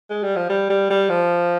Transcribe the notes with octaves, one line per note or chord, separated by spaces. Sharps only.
G#3
G3
F3
G3
G3
G3
F3